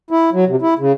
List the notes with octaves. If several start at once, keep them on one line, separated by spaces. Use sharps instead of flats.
E4
F#3
C3
E4
C#3